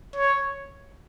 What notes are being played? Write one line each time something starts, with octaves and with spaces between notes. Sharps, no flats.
C#5